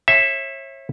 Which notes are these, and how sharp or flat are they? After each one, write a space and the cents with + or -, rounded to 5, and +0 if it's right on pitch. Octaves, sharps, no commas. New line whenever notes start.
C#5 -35 E5 +0